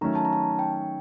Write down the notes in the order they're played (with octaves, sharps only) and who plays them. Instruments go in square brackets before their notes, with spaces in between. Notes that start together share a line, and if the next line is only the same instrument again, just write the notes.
[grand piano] D#3 F#3 A3 C#4 [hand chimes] A#5
[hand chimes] A5
A#5
A5
G5